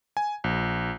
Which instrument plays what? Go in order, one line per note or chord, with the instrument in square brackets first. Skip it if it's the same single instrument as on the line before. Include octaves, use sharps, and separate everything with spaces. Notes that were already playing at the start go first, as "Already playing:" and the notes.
[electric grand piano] G#5
A#1